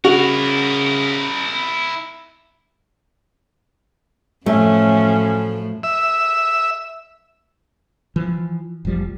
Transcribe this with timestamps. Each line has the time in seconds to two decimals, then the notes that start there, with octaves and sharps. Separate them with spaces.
0.05 C#3 E4 F#4 A#4
4.46 F#2 A2 F3 A3 C#4
5.83 E5
8.16 E3 F3
8.85 F1 A#1 F3 G3